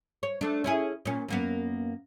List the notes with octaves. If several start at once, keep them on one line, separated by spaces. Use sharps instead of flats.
C#5
A3 D4
C#4 E4 G#4
A#2 C#4
F#2 A#3 B3